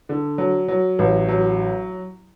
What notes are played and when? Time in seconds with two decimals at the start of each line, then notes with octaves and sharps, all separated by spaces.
0.09 D3
0.38 F#3
0.68 F#3
0.99 A1
1.28 F#3